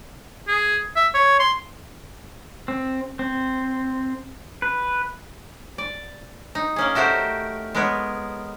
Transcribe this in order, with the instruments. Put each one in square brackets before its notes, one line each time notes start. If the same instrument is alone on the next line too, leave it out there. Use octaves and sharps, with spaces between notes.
[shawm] G#4
E5
C#5
C6
[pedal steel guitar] C4
C4
B4
[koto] D5
D#4
A#3 C#4 G#4
A3 F#4 G4 A#4 C5
G#3 B3 A#4 B4 C#5